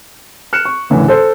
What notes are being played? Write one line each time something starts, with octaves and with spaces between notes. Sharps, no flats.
F6 F#6 C#7 E7
C#6
F#1 A2 D3 E3
A4 C5